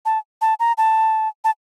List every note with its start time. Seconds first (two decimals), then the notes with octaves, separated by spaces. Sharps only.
0.06 A5
0.41 A5
0.60 A#5
0.78 A5
1.44 A5